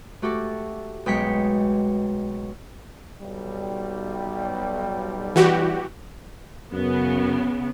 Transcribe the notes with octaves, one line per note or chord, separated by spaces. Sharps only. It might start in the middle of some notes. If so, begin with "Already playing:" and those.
A3 F#4 G4 A4
B1 G#3 G5 B6 C#7
B1 G3
E3 F#4 G4
F#2 C#3 B3